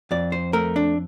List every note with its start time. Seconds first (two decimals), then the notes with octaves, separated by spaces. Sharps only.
0.11 F2 D5
0.32 C5
0.53 A3 A#4
0.76 D4